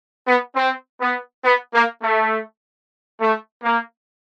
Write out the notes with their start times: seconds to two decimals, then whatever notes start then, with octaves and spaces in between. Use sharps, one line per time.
0.27 B3
0.56 C4
1.01 B3
1.44 B3
1.74 A#3
2.03 A3
3.20 A3
3.64 A#3